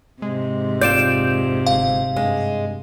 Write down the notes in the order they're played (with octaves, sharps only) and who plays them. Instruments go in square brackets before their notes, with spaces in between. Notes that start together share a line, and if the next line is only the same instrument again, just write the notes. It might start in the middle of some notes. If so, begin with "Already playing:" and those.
[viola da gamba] G#2 C3 [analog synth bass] G#3
[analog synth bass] F1 [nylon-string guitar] C4 F4 D5 [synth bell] G6 D7 E7
[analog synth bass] G1 [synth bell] F5
[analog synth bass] G2 [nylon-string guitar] G#3